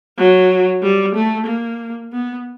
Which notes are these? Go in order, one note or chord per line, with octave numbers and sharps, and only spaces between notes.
F#3
G3
A3
A#3
B3